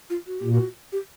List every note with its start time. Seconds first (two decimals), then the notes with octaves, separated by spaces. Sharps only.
0.10 F4
0.27 F#4
0.40 A#2 G4
0.52 F#4
0.92 G4